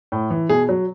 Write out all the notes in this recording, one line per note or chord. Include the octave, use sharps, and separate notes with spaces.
A2
E3
B2 G#4
F#3